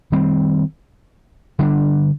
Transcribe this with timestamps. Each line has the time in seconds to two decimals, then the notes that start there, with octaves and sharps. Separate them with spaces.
0.12 D#3 G3 C4
1.59 D3 G3 D4